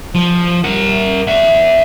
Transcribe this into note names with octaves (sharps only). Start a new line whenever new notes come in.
F3
A#4 F#5
E5 F#5